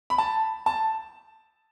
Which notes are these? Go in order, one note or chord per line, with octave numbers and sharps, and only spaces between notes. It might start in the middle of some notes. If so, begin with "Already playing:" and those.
B5
A5
A5